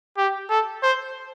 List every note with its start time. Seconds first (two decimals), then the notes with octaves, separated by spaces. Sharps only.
0.17 G4
0.50 A4
0.83 C5